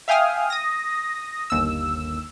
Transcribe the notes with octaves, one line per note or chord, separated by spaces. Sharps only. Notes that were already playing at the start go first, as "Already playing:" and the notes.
E5 F5 G5 G#5 D#6 F6
D#6 A#6
G1 D#2 E6